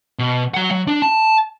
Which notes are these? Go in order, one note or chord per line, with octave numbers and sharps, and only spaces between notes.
B2
F#3 F#5
F#3
D4
A5